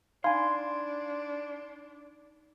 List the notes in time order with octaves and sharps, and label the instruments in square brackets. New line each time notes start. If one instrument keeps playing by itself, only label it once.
[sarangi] D4 [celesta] D#4 B5 G#6 [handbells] F5 G#5 [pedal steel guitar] C6